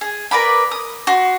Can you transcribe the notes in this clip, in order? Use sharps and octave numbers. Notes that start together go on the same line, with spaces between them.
G#4
A#4 B4 D5 B5
D#6
F#4 C6